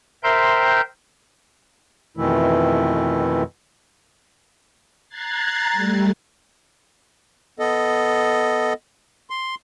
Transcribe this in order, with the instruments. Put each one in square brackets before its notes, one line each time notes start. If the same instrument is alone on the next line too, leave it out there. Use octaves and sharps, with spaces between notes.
[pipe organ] A#4 C5 E5 G5 C6 G6
[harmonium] F2 B2 D#3 E3 A3 E4
[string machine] A#5 F#6 G#6 A6 C7
G3 A3
[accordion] B3 A4 D#5
C6